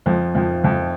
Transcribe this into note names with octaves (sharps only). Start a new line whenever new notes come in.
F2 F3
F2 F3
F2 F3